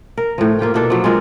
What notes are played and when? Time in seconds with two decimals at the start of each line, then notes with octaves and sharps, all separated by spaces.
0.18 A#4
0.38 A2 F3
0.59 A#3 F4 G4 G5
0.74 B2 A#3 D4 A4
0.90 F3 F#3
1.04 G#3 C4 F4 A#4